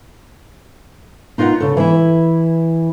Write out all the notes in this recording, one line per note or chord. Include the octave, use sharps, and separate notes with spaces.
D#4 F4 A#4 B4 F#5
C#3 A4
E3 E4